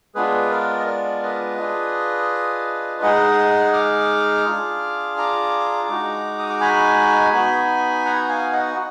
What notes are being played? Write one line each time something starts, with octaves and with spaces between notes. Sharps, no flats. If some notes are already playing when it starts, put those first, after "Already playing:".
G#3 B3 D4 F4 G#4 B4
A#4 D5
D#5
A#4 D5
B4 D#5
D4 F4 G#4
G#3 D#4 G#4 D#5 F#5
D6 F6
D4 F4 G#4
A#5 D6
G#3 D#4 F#4
D#6
D6
G#5 B5
B3 D#4 F#4
F#5 A#5
F5 G#5
D#5 F#5